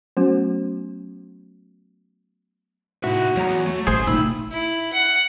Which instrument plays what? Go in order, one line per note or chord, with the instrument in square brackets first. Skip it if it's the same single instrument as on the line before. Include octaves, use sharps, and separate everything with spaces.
[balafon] F#3 A3 B3 C#4 F#4
[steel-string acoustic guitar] A2 C3 [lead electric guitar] D#4 E5 [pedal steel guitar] F#4
[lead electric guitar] E2 [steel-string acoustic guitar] F#3 C#5 A#5
[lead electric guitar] A3
[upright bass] A1 [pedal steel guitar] G#4 C5
[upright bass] A#2 [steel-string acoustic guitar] D#3 [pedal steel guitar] B5 E6
[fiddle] E4
F#5